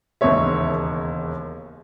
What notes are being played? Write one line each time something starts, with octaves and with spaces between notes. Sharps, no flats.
E1 D#2 C#3 G#3 C#5 E5